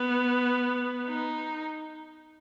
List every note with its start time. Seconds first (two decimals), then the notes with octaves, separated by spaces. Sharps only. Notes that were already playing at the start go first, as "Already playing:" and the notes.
Already playing: B3
1.07 D#4